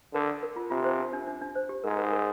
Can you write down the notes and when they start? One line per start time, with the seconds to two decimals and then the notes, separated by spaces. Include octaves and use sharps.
0.14 D3 A#4
0.28 A#4
0.43 A#4
0.56 F4
0.70 C3 F4
0.85 C5
0.99 D4
1.13 D4
1.27 D4
1.41 D4
1.56 C5
1.69 G4
1.84 G#2 A#4
1.98 A#4
2.12 A#4